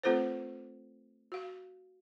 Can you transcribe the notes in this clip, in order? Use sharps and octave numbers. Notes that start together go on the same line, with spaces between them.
A3 C4 F4 A4 B4 C5
F#4 F5